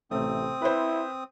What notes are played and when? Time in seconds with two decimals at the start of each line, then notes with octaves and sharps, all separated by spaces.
0.11 A1 C3 A3 C4 D#6
0.62 E4 B4 C5